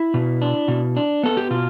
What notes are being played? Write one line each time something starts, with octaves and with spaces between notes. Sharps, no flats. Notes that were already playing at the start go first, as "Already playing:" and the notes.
Already playing: E4
B2
D4
B2
D4
B3 A4
G4
B2 F4